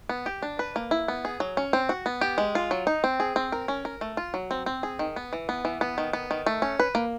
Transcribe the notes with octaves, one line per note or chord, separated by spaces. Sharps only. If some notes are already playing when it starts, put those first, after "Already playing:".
B3
G4
D4
B4
A#3
E4
B3
G#4
F#3
C#4
C4
F#4
B3
G4
G#3
F4
F#3
D#4
C4
G#4
C4
A#4
C#4
A#4
A3
F4
F#3
C4
C4
G#4
D#3
B3
E3
B3
E3
B3
D#3
B3
D#3
A3
C#4
B4
A#3